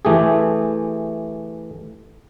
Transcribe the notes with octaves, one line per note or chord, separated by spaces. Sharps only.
E3 A3 G4 G#4